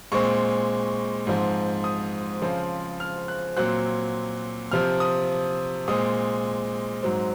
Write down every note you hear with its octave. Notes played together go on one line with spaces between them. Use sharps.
A#2 G#3 C4 C#6
G#2 F3 C4
D#6
C#3 F3 C4
F6
F#6
A#2 F#3 C4 F#6
C3 F3 C4 F6
D#6
A#2 G#3 C4 D#6
G#2 F#3 C4